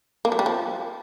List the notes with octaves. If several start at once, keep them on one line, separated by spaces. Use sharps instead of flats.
A#3
F#3
G3
F3